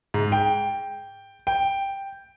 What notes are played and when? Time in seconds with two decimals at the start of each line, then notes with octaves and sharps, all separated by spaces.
0.14 G#2
0.32 G5
1.47 G5